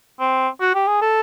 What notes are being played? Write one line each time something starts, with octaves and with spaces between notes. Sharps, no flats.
C4
F#4
G4
G#4
A4